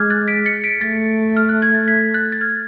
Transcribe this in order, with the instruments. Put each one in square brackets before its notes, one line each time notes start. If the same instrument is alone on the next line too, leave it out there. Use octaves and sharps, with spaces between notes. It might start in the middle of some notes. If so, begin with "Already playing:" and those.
Already playing: [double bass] G#3 [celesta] D6 F6 F#6 G#6
[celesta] F#6 A6
B6 D7
A6 C#7
B6 D7
[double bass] A3 [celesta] A6 C#7
[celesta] F6
F#6
G#6
A6
G#6 B6
F#6 A6
A6
F6 G#6